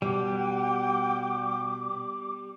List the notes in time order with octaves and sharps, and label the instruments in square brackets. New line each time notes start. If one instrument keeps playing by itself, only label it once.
[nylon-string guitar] B2 [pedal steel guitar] G3 [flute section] F#5 G5 [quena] D6